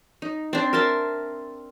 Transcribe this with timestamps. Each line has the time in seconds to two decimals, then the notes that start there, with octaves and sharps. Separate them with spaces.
0.22 D#4
0.53 C4 D4
0.73 A#4 E5 A5 C6